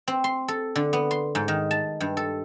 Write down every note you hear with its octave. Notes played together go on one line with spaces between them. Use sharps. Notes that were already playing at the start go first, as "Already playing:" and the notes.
C4
C6
A4
D3
B3
C6
G#2
D#3
A5
G2
A4